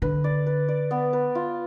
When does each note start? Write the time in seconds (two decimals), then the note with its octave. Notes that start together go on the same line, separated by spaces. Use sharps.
0.02 D3 B4
0.24 D5
0.46 B4
0.68 D5
0.91 B3
1.13 B4
1.35 F4